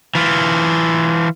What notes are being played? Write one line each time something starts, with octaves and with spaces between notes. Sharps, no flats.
E3 F4